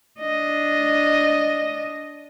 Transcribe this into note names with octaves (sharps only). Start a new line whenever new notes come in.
D4 D#5